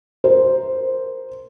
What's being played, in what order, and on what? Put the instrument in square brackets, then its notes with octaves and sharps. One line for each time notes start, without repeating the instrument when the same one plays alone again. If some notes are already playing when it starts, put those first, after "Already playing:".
[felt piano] A#4 C5